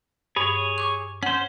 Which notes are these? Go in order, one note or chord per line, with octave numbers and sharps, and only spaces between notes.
G2 G#4 C#5
C#6 D6
C#4 C5 F#5